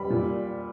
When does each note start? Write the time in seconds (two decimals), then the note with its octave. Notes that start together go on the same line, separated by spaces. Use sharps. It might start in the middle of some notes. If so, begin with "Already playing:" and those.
Already playing: G3 B5
0.10 A#2